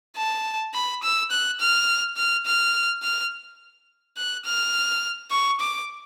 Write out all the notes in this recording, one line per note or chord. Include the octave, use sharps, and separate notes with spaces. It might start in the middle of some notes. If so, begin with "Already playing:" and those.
A5
B5
E6
F#6
F6
F6
F6
F6
F#6
F6
C#6
D6